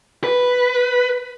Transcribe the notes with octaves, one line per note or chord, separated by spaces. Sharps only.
B4